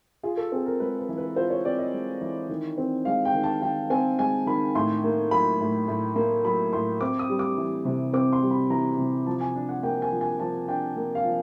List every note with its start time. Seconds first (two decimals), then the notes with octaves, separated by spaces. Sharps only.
0.23 F4 G#4
0.37 A4
0.52 C4 G#4
0.66 A#4
0.80 G#3 B4
0.99 B4
1.09 E3
1.18 B4
1.36 F4 C5
1.50 C#5
1.64 C4 D5
1.79 D#5
1.93 G#3
2.21 E3
2.49 D#3
2.78 C4
3.05 G#3 F5
3.25 G5
3.34 D#3
3.43 A5
3.62 D#3 G5
3.90 C4 G#5
4.19 G#3 G#5
4.46 D#3 B5
4.75 A2 C6
5.04 A#3
5.31 F#3 B5
5.60 A2
5.88 A2
6.16 A#3
6.45 F#3 B5
6.73 A2 C6
7.01 C4 D6
7.19 D#6
7.30 G3
7.39 D6
7.58 E3
7.85 C3
8.13 C4 D6
8.33 C6
8.42 G3
8.51 B5
8.70 E3 A#5
8.99 C3
9.26 F3 A5
9.41 G#5
9.55 D4
9.69 F#5
9.83 A#3 G5
10.02 G#5
10.12 F3
10.21 G#5
10.39 F3 A5
10.68 D4 G5
10.97 A#3
11.15 F5
11.25 F3